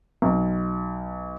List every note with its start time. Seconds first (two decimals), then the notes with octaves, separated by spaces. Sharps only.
0.22 B1